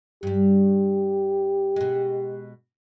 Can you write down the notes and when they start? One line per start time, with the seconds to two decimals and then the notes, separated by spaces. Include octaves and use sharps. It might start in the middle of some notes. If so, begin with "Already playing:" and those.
0.23 G2 G3 G4
1.76 B2 G#3